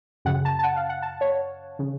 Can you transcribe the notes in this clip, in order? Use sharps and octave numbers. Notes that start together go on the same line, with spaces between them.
F#2 C#3 F#5
A5
A5
F#5
F5
F#5
A5
C#5
C#3